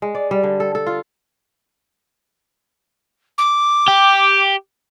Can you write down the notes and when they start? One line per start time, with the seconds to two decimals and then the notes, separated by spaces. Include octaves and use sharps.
0.02 G#3
0.15 D5
0.31 G3
0.43 D3
0.60 A4
0.75 A4
0.86 F4
3.38 D6
3.88 G4